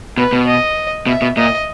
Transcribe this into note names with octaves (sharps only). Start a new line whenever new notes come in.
B2 B4
B2
D#5
B2 E5
B2
A#2 D#5